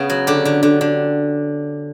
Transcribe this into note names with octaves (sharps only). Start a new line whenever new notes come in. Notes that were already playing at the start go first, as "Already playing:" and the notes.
Already playing: C#3 B3
F#3
D3 G4
D3
D3
D3